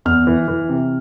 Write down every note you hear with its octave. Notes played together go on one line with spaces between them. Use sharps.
E2 F6
E3
E3
C3